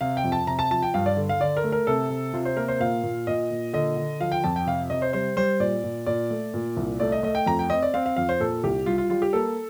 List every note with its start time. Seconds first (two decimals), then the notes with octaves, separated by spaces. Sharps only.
0.01 C3 F5
0.17 G5
0.24 F2
0.32 A5
0.47 C3 A#5
0.59 A5
0.71 F3 A5
0.83 G5
0.94 G2 F5
1.06 D5
1.17 D3
1.29 F5
1.40 D3 D5
1.57 A#4
1.64 A3
1.72 A#4
1.87 C3 A4
2.10 C3
2.33 C3 F4
2.45 C5
2.57 A#3 A#4
2.68 C5
2.80 A#2 F5
3.03 A#2
3.27 A#2 D#5
3.51 A#2
3.73 D3 D#5
3.97 D3
4.21 F3 F5
4.32 G5
4.44 F2 A5
4.56 G5
4.67 C3 F5
4.90 C3 D#5
5.02 C5
5.13 G3 C5
5.37 G3 C5
5.60 A#2 D5
5.84 A#2
6.06 A#2 D5
6.30 A3
6.54 A#2
6.77 C2
7.00 A3 D5
7.12 D#5
7.23 A3 D#5
7.35 G5
7.46 F2 A#5
7.59 G5
7.70 C4 D#5
7.83 D5
7.94 C4 F5
8.06 F5
8.16 F2 F5
8.29 C5
8.40 A#2 A4
8.64 C2 G4
8.86 G3 F4
8.98 F4
9.10 G3 F4
9.22 G4
9.33 A#3 A4